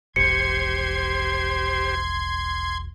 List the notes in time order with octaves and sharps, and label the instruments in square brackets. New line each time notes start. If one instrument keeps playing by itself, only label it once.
[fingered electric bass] E1 A#1 [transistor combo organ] G4 C5 [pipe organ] C6 G#6 [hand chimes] C#7